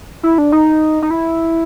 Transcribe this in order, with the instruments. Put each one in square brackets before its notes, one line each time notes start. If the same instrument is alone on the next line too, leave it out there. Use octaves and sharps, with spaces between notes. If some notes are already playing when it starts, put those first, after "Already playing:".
[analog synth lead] E4
D4
D#4
D#4
E4